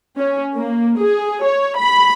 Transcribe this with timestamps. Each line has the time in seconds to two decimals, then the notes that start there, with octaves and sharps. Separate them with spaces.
0.18 C#4
0.55 A#3
0.98 G#4
1.44 C#5
1.77 B5